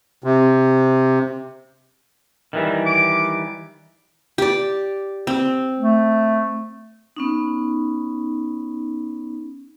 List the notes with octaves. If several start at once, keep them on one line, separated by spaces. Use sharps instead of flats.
C3
D#3 E3 G3
D6
G4 D5
C4
A3
B3 C#4 D#4